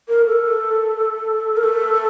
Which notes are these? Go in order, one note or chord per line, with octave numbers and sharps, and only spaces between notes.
A#4
A4
A#4
A4